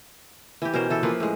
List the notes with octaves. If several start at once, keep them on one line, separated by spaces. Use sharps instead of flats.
E3 G4
B2 C#4 A#4 C5
E3 A4
F3 A#3 F4 B4
A2 G#3